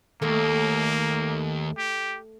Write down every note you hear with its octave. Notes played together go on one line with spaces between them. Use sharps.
D#2 A3 A#3 A4
G4